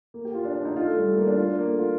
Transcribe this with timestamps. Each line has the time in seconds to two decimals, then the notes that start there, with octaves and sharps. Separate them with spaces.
0.14 A#3
0.25 G4
0.34 F4
0.44 D4
0.55 D4
0.65 D#4
0.76 F4
0.86 A3
0.97 G3
1.06 A3
1.17 A#3
1.27 D4
1.37 F4
1.48 D4
1.58 A#3
1.69 A3
1.79 F4